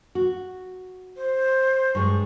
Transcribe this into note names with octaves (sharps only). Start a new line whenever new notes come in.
F#4
C5
G2 G#3 C#6